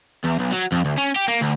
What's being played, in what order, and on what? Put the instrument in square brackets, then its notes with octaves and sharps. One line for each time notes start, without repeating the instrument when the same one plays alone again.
[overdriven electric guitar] E2
B1
F#3
F2
D2
C#4
G4
A#3
D2